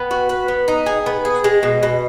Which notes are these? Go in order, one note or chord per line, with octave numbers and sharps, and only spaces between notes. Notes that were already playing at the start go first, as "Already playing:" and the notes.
Already playing: B3
F#4
B4
B3
D#4
G#4
B3
G#4
G#3
B2
B2